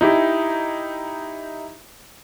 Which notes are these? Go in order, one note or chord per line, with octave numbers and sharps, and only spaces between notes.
D#4 E4 G4